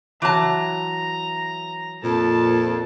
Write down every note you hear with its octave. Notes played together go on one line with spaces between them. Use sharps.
E3 F#3 A5 A#5
F2 A#2 A5